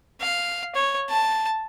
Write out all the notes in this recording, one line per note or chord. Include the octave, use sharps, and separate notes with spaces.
F5
C#5
A5